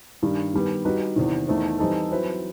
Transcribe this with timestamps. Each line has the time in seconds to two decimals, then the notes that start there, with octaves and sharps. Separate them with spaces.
0.22 G2 D#3 G3
0.54 D#3 G3 B3
0.85 G3 D#4 F#4 B4
1.16 E2 C3 D#3
1.48 E2 D#3 A3 C4 D#4
1.79 E3 G3 C4 D#4 A4
2.11 F#3 C4 E4 B4